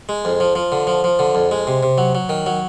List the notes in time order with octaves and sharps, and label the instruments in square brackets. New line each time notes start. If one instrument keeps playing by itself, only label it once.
[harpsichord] G#3
F2
F3
F3
D3
F3
F3
D3
F2
G#3
C3
C3
F#3
F#3
D#3
F#3